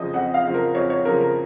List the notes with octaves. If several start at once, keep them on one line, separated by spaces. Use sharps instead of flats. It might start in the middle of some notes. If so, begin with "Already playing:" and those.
Already playing: F2 C#3 F3 D#5
F2 F#5
F5
C#3 F3
A#4
F2 C#5
C#5
C#3 F3 A#4
A#4